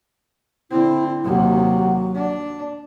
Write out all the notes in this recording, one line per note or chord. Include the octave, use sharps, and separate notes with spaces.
D3 C4 E4
D#2 C3 F#3
D4